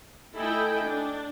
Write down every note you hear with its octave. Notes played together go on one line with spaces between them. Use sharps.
A3 E4 A4 D#5 G5 G#5
D4